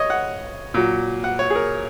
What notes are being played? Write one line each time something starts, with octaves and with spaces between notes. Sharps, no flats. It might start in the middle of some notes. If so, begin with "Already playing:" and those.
Already playing: C#5 D#5
F#5
A#2 F#3
F#5
C#5
G#4
A#4